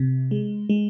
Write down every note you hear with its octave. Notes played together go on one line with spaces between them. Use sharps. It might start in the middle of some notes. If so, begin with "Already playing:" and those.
Already playing: C3
G#3
G#3